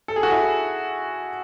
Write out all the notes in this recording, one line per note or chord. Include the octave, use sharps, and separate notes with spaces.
A4
G#4
F#4
E4 G#4